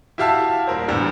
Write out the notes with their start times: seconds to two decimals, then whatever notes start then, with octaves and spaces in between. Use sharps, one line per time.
0.18 E4 F#4 G4 E5 F5 A5
0.67 D#1 A#4 C5
0.88 E2 A2 D3 G3